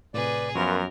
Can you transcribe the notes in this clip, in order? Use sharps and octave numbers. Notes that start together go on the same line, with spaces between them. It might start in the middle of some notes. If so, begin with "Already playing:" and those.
A2 C3 G#4 B4 D5
F#2 F3 B3 F4 A#4 B4 C#6